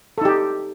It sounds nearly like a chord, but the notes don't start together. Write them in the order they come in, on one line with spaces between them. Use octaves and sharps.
A4 D#4 G4